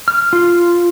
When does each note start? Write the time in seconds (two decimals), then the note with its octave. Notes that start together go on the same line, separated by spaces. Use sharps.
0.08 F6
0.33 F4